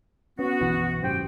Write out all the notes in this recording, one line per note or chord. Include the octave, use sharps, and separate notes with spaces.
B3 C#4 F#4
B1 F#2 E3
G#1 F#2 G4 C5 G5